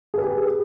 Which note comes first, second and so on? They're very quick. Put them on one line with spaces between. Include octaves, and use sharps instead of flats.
G#4 B4 G4